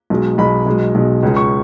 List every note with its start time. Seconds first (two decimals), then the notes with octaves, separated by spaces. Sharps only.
0.10 B1 B2 G#3
0.38 B1 B2 G#3 B5
0.66 B1 B2 G#3
0.95 B1 B2 G#3
1.23 C#2 C#3 G#3
1.37 C#6